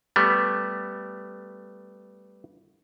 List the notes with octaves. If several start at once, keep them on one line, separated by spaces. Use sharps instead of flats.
G3 A3 B3